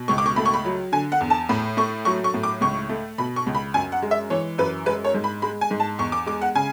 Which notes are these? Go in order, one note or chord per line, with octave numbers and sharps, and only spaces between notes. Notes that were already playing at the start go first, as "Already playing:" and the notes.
Already playing: B2
C#2 C#6
D6
C#6
A3 B5
C#6
B5
F#3
D3 G#5
F#5
E2
A5
A2 B5
A3 C#6
F#3 C#6
C#6
A2
D6
C#2 C#6
A3
B2 B5
C#6
C#2
B5
F#2 G#5
F#5
G#3
E5
E3 C#5
F#2 B4
G#3 B4
C#5
G#2
B5
G#3 B5
G#5
G#2
A5
E2 C#6
D6
G#3 D6
F#5
C#3 G#5